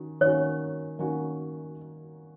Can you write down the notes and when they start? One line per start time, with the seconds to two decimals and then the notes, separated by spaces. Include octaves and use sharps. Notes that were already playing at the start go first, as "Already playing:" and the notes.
Already playing: D#3 C#4 F#4
0.21 D#3 A#3 C#4 F#4 C#5
0.99 D#3 A#3 C#4 F#4